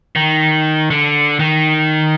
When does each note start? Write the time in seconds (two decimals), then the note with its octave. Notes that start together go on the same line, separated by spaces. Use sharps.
0.16 D#3
0.90 D3
1.39 D#3